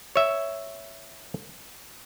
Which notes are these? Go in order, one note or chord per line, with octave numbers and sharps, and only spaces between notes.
C#5 E5